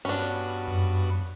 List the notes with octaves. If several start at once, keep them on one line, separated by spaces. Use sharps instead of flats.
G2 B3 C#4 D4 F#4
F#2